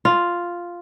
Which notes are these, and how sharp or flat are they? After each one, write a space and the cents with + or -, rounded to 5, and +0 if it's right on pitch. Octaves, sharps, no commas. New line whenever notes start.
F4 +0